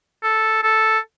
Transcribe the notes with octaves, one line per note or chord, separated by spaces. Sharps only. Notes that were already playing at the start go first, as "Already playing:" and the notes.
A4
A4